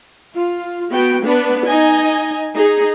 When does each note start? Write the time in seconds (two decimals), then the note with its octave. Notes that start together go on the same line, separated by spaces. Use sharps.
0.35 F4
0.91 B3 F#4 G5
1.23 B3 D4 B4
1.65 D#4 D#5 G#5
2.54 D#4 G#4